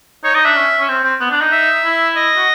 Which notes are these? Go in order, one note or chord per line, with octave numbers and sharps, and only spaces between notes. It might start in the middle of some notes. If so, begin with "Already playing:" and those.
D#4 C#5
D#4 D#5
D4 E5
C#4
C#4
C4
C4
B3
D4
D#4
E5
E4
D#5
F#4